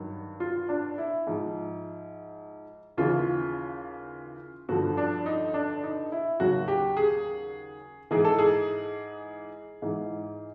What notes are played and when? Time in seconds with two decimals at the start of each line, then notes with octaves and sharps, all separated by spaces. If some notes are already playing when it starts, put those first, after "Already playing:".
Already playing: G2 D#3 F#3
0.40 F4
0.69 D4
0.98 E4
1.27 G#2 F3
2.97 D#2 C#3 E3 F4
4.69 G2 D3 F3 F#4
4.97 D4
5.26 D#4
5.54 D4
5.83 D#4
6.12 E4
6.40 D#2 C#3 F#3 F#4
6.68 G4
6.97 G#4
8.11 G#2 E3 G#4
8.24 A4
8.39 G#4
9.82 G#2 E3